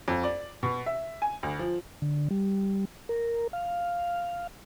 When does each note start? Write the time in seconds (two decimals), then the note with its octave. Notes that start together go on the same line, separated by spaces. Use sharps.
0.08 F2
0.24 D5
0.63 B2
0.86 E5
1.22 G#5
1.43 D2
1.59 F3
2.02 D3
2.31 G3
3.09 A#4
3.53 F5